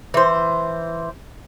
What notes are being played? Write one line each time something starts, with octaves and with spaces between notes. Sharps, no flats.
E3 C5